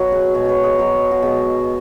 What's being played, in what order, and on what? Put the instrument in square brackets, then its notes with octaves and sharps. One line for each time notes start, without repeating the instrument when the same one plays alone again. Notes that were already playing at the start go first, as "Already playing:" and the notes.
Already playing: [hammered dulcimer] B2 F#3 F#4 B4 C#5
G#4
B2 G#3 C#5
B4 C#5
G#4
B2 F#3 C#5
F#4
B2 G#3 G#4